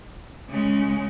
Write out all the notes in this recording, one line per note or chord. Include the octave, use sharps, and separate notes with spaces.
C#3 G#3